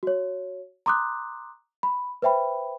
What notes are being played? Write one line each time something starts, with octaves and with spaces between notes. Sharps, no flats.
F#4 C#5
A#5 C6 D6 D#6 F#6
B5
B4 C5 E5 G5 B5